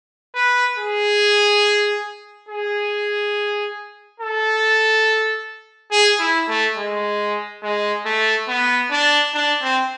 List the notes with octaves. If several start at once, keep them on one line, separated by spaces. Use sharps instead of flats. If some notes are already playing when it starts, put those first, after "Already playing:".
B4
G#4
G#4
A4
G#4
E4
A3
G#3
G#3
A3
B3
D4
D4
C4